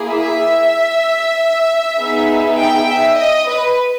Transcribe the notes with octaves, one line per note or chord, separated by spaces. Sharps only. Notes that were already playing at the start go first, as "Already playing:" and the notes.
Already playing: A#3 E4 G#4
E5
B3 D#4 G#4
G5
E5
D#5
B4